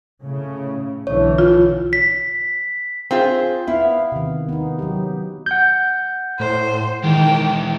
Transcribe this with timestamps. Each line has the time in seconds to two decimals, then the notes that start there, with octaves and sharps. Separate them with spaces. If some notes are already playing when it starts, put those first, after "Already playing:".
0.24 A2 C#3
1.07 B1 D3 E3 C#5
1.38 F4
1.93 B6
3.11 C4 F4 G#4
3.67 B3 E4 F5
4.12 C3 D#3
4.49 B3 D#4
4.79 F#3 G4
5.46 F#5 G6
6.40 A2 C5
7.03 D#3 E3 G#3 G5